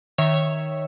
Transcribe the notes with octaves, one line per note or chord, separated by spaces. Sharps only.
D#3 C#5 E5
C#5